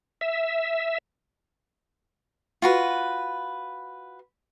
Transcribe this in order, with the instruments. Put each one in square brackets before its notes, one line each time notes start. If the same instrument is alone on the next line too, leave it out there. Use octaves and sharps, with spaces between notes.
[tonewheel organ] E5
[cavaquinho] F4 F#4 B4